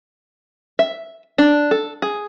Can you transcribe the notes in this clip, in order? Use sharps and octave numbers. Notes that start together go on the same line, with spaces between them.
E5
D4
A4
G#4